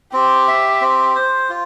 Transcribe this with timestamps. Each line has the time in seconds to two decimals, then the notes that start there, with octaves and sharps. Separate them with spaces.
0.13 C4 G4
0.48 E5
0.81 C4
1.15 C5
1.50 F4